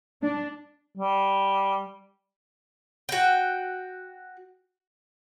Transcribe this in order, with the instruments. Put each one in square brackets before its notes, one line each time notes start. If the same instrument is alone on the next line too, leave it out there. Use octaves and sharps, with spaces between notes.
[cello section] D4
[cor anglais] G3
[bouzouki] F#4 G5